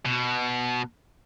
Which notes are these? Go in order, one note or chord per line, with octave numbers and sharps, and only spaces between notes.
B2